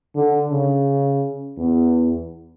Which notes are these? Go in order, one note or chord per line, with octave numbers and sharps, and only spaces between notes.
D3
C#3
E2